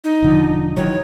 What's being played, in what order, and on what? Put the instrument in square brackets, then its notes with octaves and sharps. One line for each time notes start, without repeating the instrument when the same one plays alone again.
[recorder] D#4
[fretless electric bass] E1 D3 F3
[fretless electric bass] D#3 E3 F#3 [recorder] C#5